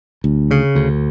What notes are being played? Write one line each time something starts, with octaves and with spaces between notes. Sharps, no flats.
D2
C#3
D2